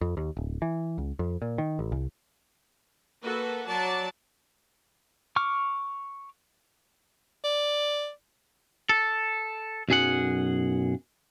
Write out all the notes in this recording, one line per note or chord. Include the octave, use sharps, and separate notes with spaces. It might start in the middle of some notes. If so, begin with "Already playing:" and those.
F2
D#2
D1
E3
C#2
F2
A#2
D#3
A1
C2
A#3 F#4 A4 B4
F#3 D5 A5
C#6 D6 F6
D5
A4
B1 F#2 G#4 F#5